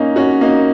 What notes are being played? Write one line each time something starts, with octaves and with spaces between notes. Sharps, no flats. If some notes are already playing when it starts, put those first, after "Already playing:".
Already playing: A#3 C#4 D#4
C#4 F#4
A#3 D#4